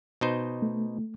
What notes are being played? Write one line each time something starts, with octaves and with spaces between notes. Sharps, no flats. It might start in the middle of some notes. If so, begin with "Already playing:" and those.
B2 D#4 C5
A3